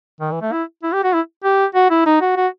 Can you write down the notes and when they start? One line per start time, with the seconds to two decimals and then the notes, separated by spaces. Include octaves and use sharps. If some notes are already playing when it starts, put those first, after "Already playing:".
0.21 D#3
0.31 E3
0.42 A3
0.52 E4
0.83 E4
0.93 G4
1.04 F#4
1.14 E4
1.44 G4
1.75 F#4
1.90 E4
2.06 D#4
2.21 F#4
2.37 F#4